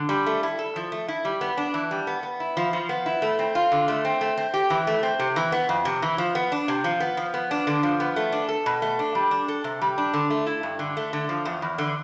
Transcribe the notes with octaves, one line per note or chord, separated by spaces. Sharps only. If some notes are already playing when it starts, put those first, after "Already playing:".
Already playing: D3
G3
A3
E4
A4
F3
A3
E4
G3
B3
D4
E3
G3
B3
B3
E4
F3
F3
B3
E4
A3
C4
F4
D3
A3
C4
A3
C4
G4
E3
A3
C4
C3
E3
B3
F2
C3
E3
F3
B3
D4
C3
F3
B3
F3
B3
D4
D3
F3
B3
A3
D4
A4
B2
A3
D4
G3
D4
A4
C3
G3
D4
D3
A3
E4
G2
D3
A3
D3
F3
E2
E2
D3